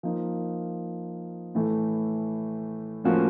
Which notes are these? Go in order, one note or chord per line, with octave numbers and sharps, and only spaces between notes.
F3 A#3 D#4
A2 E3 A3
A2 F3 A#3 C#4 F#4